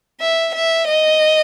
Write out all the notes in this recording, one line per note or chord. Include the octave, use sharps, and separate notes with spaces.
E5
E5
D#5